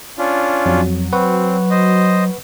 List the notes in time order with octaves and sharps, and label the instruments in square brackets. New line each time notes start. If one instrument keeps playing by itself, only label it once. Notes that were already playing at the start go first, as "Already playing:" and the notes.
[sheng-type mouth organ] C#4 D4 F4
[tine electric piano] F2 [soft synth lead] F#3
[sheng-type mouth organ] C4 [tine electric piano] B4 F#5 C#6
[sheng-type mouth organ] C5 D#5